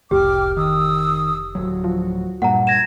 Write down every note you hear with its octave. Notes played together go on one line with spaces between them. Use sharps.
F1 C2 G4 G5 D6 F6
D#3 D#6 E6
D1 F#3 F#4
F3
G2 A#2 F#5 A#5
G#6 A#6 E7